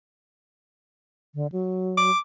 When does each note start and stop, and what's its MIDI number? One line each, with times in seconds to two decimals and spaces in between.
1.35 1.47 50
1.52 2.11 54
1.98 2.19 86